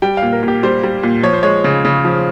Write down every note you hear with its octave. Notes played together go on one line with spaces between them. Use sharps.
G3 G5
F5
A#2
A#4
A#2
G4
G3 C5
G3
A#2
F3 C#5
C5
G#3 C#5
C#3
C#3
F3